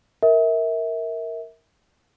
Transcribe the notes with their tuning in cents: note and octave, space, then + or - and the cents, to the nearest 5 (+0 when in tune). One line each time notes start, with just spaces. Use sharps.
A#4 -5 E5 -30